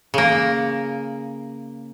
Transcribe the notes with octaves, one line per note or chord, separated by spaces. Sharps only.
C#3 A#3